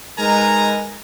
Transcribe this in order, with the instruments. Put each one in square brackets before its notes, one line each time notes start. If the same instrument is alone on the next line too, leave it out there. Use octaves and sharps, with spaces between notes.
[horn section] G#3 D#4 A#4 B4 G#5 A#5